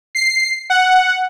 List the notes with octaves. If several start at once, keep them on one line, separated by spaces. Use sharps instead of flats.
C7
F#5